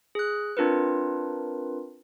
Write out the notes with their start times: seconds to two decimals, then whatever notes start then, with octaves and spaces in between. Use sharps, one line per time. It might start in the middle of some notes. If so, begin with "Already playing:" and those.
0.15 G#4 F#6
0.57 C4 D4 F4 A#4 B4